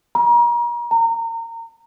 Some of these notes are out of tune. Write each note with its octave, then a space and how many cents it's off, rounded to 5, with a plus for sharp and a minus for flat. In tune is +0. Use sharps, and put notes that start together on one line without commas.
A#5 +35
A#5 -30